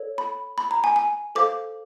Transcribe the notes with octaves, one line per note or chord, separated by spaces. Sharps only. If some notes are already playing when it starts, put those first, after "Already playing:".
Already playing: A4 C#5
B5
B5
A#5
G#5
G#5
A4 C5 F5 D6